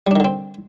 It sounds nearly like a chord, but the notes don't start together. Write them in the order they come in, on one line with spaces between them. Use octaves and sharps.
G3 D4 D#3 D3 C4